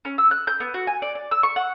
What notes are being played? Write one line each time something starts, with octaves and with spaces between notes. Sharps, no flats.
C#4
E6
F#6
G6
B3
F#4
G#5
D5
D5
E6
C#6
F#5